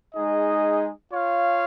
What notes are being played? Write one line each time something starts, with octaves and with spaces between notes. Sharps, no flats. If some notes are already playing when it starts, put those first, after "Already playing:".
G#3 D#4 G#4 D#5
F4 C#5 F5